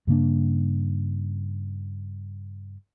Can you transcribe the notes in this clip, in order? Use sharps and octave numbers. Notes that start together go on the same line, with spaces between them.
G2 C#3 A#3 D4